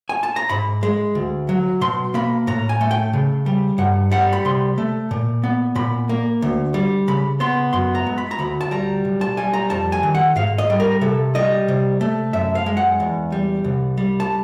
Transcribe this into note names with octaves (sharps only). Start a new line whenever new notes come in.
G#5
A5
A#5
G#2 B5
G#3
D2
F#3
B2 C6
A#3 B5
A2 A#5
G#5
A3
G5
C#3
G3
G2 F#5
G3 F#5
B5
C3 C6
A3
A#2
B3
A#2 B5
A#3
D2
G3
C#3 B5
B3 C6
F#2 C6
A#5
G#3
B5
A#5
D2 B5
A5
G3 A#5
B1
A5
G3 G#5
A#5
F2 A5
G#5
D#3
F#5
G#2 F5
D#5
G3
A#4
C3 A4
G3 D#5
C3
A3
F#2 E5
F5
G#3
F#5
E2
G3
C2
G3
A5